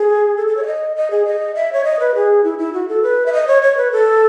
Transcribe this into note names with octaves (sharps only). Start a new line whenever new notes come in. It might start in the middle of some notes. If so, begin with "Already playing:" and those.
Already playing: G#4
A4
A4
C#5
E5
D#5
D#5
G#4
D#5
E5
C#5
D#5
B4
G#4
E4
E4
F#4
A4
B4
E5
D#5
C#5
C#5
B4
A4